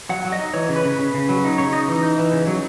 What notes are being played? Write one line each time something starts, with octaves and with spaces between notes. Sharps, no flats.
F#3 F#5
F#3
D#5
D#4
E3 C#5
C#3
B4
C#3
C#3
C#3
F#3
D#4
C#3 C#5
D#4 D#5
E3
D#4
E3
C#3
F#3